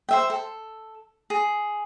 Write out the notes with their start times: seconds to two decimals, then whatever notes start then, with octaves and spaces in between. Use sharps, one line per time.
0.09 C5 E5 G5
0.30 A4
1.30 G#4